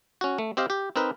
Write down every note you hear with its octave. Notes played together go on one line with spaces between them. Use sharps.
C#4 F#4
A3
C4 G4 D#5 F5
G4
C4 D#4 A#4 B4